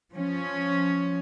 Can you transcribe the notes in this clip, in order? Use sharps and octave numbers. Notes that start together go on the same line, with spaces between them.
F3 C#4